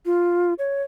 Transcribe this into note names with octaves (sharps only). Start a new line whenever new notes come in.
F4
C#5